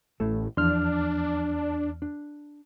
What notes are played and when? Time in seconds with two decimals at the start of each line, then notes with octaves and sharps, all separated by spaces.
0.20 A1 A2 A3 A4
0.57 E2 F3 D4 C6 F6
2.02 D4